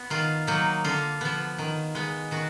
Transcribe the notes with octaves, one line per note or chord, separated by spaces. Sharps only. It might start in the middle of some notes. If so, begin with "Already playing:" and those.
Already playing: B3
D#3 F4
F#3 A#3 D#4
D3 F4
F3 B3
D#3
G#3 B3
D#3 F#4